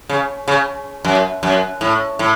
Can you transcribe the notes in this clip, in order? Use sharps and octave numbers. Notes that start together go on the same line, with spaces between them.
C#3
C#3
F#2
F#2
A2
A2